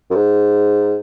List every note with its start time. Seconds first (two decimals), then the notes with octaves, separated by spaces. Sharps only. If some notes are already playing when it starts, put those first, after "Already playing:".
0.10 F#2
0.15 G#2